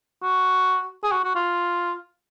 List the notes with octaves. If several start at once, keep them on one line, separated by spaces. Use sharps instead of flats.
F#4
G#4
F#4
F#4
F4